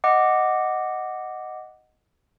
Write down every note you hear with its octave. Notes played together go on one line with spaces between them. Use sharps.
D#5 F#5 D6